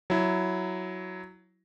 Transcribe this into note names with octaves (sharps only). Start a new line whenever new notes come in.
F#3 E4